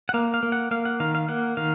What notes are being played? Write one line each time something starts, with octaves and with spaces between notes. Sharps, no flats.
F#5
A#3 F5
F5
A#3
F#5
A#3 F5
F#5
D#3 F5
F5
A#3 F#5
D#3 F5